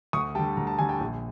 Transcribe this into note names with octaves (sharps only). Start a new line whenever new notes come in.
D2 C#6 D#6
D3 G3 G5 A5
D2 A#5
A5
D3 G3 G#5
G5 A5
A#1